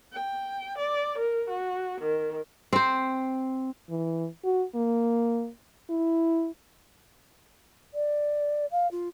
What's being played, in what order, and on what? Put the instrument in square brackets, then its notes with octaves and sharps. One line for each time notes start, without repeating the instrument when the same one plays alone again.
[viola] G5
D5
A#4
F#4
D#3
[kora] C4 C5
[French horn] E3
F#4
A#3
E4
[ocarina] D5
F5
F4